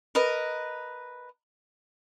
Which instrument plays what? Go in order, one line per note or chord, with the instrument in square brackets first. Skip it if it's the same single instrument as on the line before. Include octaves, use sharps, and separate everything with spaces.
[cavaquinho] A#4 B4 D#5